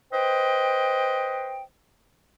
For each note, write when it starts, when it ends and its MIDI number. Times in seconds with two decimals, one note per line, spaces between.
0.12 1.62 71
0.12 1.62 72
0.12 1.62 75
0.12 1.62 79